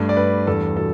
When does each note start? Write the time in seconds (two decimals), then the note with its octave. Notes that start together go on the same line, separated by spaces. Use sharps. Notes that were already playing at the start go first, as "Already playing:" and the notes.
Already playing: G2 A3
0.09 D5
0.17 G2 B4
0.47 E2 A4
0.77 B2 A4